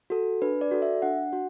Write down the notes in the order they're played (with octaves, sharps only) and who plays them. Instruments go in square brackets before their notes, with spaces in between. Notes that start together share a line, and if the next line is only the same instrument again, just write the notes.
[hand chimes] F#4 A4
D4 B4
D5
F#4 A4
E5
D4 F#5
F#4